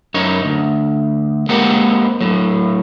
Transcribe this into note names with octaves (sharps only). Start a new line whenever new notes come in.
F#2 D#4 C#5
D2
G#3 A#3 C4 G4 C5 F#5
A2 F#3